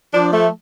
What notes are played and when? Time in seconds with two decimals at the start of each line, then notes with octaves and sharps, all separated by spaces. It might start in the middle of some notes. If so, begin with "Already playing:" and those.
0.14 F3 D4
0.33 A3